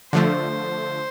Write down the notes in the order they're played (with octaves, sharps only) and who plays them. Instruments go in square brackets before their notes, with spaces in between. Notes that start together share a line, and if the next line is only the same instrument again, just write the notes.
[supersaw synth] D3 F3 A3 [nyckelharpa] C5